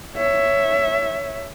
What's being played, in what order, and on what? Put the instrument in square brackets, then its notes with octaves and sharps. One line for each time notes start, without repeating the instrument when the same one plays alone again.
[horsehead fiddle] C#5 E5